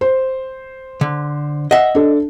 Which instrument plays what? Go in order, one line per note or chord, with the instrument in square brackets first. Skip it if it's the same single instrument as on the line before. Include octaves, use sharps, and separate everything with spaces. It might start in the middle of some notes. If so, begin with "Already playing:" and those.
[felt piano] C5
[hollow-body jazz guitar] D3
[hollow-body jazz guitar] D#5 E5 [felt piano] F#5
[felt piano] D4 A4